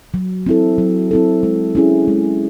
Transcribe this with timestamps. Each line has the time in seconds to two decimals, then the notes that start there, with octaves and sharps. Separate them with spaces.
0.14 F#3
0.46 C4 E4 A4
0.78 F#3
1.11 C4 E4 A4
1.43 G#3
1.75 C#4 E4 G#4
2.08 G#3